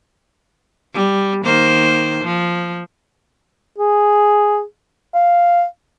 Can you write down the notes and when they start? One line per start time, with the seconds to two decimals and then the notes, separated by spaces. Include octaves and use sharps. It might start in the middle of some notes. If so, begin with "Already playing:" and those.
0.94 G3
1.44 D#3 A#3 C5
2.24 F3
3.78 G#4
5.14 F5